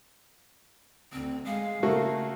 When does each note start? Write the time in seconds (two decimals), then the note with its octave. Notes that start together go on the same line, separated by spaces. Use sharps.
1.12 D2 C4
1.45 G#3 F5
1.83 C#3 A3 A#3 F#4